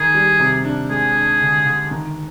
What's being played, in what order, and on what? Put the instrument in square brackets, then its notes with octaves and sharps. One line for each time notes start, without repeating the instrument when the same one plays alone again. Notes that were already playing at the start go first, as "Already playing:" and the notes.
Already playing: [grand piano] D#3 [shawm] G#4
[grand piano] G3
C3
D4
[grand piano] G#3 [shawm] G#4
[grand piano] D4
D3
D3
D#3